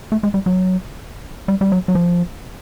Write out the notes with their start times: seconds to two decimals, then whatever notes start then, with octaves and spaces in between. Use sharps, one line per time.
0.12 A3
0.23 G#3
0.34 G3
0.46 F#3
1.48 G3
1.61 G3
1.72 F#3
1.88 F#3
1.95 F3